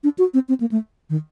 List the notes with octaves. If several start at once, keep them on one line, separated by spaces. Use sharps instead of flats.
D4
F#4
C4
C4
A#3
A3
D#3